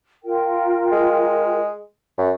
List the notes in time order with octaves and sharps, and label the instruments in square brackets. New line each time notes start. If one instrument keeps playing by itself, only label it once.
[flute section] F4 A#4 G5
[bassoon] G#3
F#2